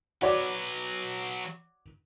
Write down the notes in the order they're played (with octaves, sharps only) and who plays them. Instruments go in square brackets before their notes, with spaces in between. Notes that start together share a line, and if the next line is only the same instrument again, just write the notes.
[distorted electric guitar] F#3 B4 [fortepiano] F#4 C#5 D5